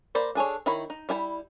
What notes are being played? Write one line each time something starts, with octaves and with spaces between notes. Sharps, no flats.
A#3 C5 D5 B5
D4 G#4 A4 C#5
D#3 E4 C#5 B5
D#4
G3 E4 G#5 B5